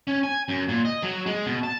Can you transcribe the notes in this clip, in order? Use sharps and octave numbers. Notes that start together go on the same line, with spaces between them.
C#4
G#5
F#2
A#2
D#5
F#3
G#3
B2
A5